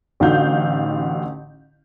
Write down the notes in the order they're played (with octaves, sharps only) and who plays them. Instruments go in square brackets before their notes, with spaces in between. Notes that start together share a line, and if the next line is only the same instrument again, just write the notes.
[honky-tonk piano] A1 D3 D#4 F#4 F5 G6